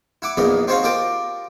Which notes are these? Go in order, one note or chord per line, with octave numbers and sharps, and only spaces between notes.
E4 F#5 D6
A#1 E2 A#2 B3 D#4 D#5
C4 D#4 F#4 C5 C#5 F5
F4 G4 A#4 D5 D#5 G5